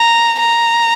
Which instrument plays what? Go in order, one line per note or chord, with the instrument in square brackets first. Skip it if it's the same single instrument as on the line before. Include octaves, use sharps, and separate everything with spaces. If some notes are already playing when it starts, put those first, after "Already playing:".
Already playing: [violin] A#5
A#5